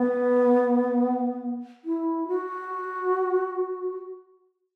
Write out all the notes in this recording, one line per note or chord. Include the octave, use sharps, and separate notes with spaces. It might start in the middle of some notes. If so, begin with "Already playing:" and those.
Already playing: B3
E4
F#4